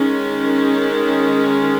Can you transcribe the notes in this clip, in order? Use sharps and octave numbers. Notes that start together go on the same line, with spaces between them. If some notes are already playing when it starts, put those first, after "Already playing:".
Already playing: D#3 G#3 C#4